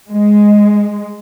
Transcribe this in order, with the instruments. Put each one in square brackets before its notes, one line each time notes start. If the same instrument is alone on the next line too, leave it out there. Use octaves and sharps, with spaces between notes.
[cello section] G#3